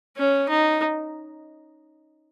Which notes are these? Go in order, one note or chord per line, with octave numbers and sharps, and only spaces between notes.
C#4
D#4